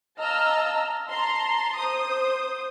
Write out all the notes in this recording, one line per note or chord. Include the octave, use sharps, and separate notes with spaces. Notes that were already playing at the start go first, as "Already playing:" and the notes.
D#5 F5 A5 A#5 E6 F6
A5 A#5 C6
C5 D#6